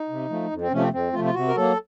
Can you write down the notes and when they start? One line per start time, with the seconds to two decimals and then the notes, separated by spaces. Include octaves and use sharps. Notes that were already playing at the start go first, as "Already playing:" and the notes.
Already playing: D#4
0.09 C3
0.29 F3 A3
0.51 F2
0.61 C4
0.72 C3 F3 A3 C#4
0.82 C4
0.92 F2 C4
1.13 C3 F3 A3 F4
1.25 F4
1.34 C3 F#4
1.48 A#4
1.56 F#3 A#3 A4